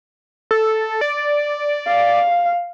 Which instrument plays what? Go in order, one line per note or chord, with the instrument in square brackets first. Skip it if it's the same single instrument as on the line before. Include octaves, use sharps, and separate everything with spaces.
[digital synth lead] A4
D5
[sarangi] F5